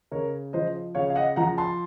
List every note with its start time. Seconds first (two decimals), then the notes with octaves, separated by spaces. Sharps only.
0.11 C#3 A#4 C#5
0.53 F3 C5 D#5
0.95 C#3 C#5 F5
1.10 F5
1.16 D#5 F#5
1.36 F3 F#5 A#5
1.58 A5 C6